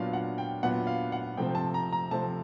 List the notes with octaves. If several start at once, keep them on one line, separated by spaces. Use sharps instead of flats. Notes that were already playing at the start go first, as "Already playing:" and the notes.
Already playing: A#2 F#3 B3 D4 F4 F5
F#5
G5
A#2 F#3 B3 D4 F4 F#5
F5
F#5
C3 F3 A3 C4 G5
A5
A#5
A#5
C3 F3 A3 C4 A5